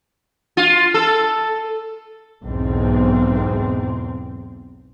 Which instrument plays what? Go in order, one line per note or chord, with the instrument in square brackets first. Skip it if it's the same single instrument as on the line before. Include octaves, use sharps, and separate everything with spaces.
[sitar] F4
A4
[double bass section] B1 E2 G#2 C4